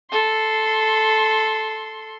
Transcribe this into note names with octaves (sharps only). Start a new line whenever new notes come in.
A4 C6